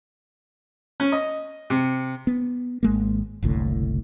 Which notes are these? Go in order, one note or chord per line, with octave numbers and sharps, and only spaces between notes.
C#4
D#5
C3
B3
G#1 G#3 A#3
F#1 C2 A2 D3